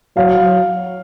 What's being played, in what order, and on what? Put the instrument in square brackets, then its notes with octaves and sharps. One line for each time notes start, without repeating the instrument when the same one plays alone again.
[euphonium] F#3 [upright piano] F5